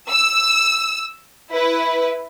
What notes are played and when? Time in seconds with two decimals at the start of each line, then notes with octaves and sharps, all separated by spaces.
0.10 E6
1.50 E4 B4